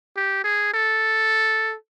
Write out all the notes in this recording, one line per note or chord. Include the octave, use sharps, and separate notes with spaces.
G4
G#4
A4